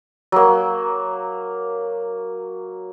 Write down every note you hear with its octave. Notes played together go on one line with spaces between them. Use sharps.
F#3 A#3